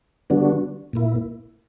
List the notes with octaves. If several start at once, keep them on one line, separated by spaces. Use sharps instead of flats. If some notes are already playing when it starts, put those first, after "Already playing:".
D3 G3 B3 D4 F#4
A#2 A#3 E4